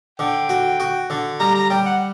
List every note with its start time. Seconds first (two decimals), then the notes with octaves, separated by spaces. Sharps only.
0.19 D3 G5
0.49 F#4
0.80 F#4
1.10 D3
1.40 G3 A#5
1.55 A#5
1.70 G3 G5
1.86 F#5